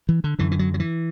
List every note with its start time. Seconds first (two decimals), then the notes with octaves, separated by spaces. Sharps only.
0.09 E3
0.24 D3
0.39 F#2 D3 E3
0.52 E3
0.59 F#3
0.74 F#3
0.80 E3